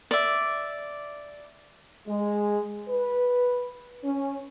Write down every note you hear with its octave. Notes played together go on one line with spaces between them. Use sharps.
D5 E5
G#3
B4
C#4